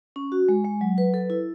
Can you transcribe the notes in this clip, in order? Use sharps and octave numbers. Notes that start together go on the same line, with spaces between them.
C#4
F#4
G#3
G#3
F#3
B4
A4
E4